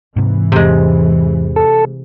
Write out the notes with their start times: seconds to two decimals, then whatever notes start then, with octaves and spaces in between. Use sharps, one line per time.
0.16 G#2 C3 E3
0.52 E2 G#2 C3 G#3
1.56 A4